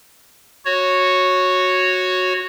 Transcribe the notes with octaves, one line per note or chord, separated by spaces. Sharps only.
F#4 C#5